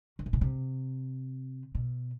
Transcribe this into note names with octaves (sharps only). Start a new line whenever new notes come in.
D#3
C3
B2
C3
B2